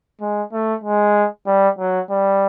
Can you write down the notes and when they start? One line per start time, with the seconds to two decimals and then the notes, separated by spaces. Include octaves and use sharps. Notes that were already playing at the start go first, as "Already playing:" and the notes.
0.21 G#3
0.52 A3
0.83 G#3
1.46 G3
1.78 F#3
2.10 G3